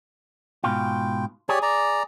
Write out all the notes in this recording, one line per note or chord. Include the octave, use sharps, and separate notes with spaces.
G#2 B2 F4 G5
G4 G#4 C#5 D5
D5 A#5